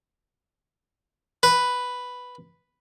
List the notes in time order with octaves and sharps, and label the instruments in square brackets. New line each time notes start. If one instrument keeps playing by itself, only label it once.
[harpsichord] B4